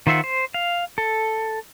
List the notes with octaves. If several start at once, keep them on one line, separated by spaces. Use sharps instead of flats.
D#3 F4 C5 E5 F#5
C5
F5
A4